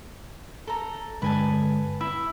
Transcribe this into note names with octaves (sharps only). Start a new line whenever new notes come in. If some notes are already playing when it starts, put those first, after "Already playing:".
A4 A#5
G2 D3 G#3 B4 G#5 A5
E4 E6